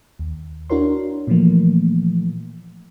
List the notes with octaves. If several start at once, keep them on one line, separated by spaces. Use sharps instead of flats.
D#2
D4 E4 F#4 A#4 C#5 C6
A#2 E3 F3 A3 A#3